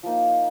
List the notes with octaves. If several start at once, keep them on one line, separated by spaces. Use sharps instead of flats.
F3 A#3 D#4